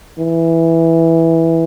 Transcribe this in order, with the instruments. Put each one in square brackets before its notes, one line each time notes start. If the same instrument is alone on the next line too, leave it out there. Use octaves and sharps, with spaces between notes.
[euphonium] E3